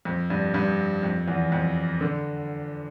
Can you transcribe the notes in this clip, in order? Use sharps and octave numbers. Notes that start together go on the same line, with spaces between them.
F2
G2
G2
F2
E2
F2
D3